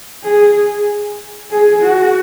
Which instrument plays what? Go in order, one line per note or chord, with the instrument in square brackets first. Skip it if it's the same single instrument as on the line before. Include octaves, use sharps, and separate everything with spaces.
[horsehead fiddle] G#4
G#4
F#4